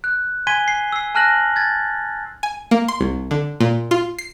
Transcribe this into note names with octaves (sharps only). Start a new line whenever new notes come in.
F#6
G#5 C6 G#6 B6 D#7 G7
C7
E6 C7
G#5 A5 F6 F#6 A#6 F#7
G#6 A6
G#5
A#3
C6
C2
D3
A#2
F4
C7